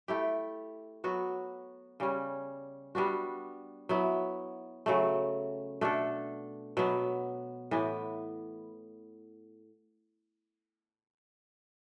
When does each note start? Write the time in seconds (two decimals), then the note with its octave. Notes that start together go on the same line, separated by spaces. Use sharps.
0.08 A3 E4 G4
1.04 F#3 B3 F#4
2.00 C#3 G3 C#4
2.95 G3 B3 D4 F#4
3.89 F#3 B3 E4
4.86 C#3 F#3 A3
5.81 B2 A3 D4 A4
6.77 B2 F#3 B3
7.71 A2 E3 B3